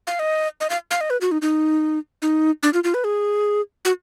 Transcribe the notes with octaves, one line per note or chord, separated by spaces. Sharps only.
F5
D#5
D#5
F5
F5
D#5
B4
F#4
D#4
D#4
D#4
D4
F4
F4
B4
G#4
F#4